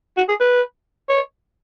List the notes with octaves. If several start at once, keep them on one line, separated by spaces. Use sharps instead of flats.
F#4
G#4
B4
C#5